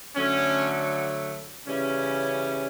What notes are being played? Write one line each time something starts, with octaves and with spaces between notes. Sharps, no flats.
D3 F#3 A3 C#4
C#3 E3 G3 C#4